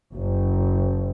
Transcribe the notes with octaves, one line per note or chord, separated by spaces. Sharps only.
F#1